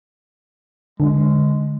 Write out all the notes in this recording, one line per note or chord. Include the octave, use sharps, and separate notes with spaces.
D3 G#3